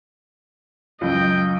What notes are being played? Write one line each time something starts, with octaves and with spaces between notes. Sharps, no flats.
C#2 F#2 D#5 G5